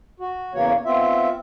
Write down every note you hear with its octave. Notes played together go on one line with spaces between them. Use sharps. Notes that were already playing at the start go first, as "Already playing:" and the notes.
F#4
E2 C#3 E3 A#3 C#5
B3 C4 F4 E5